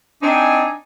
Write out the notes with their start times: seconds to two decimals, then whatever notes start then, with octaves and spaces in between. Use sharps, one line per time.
0.22 C4 D4 D#4 G#5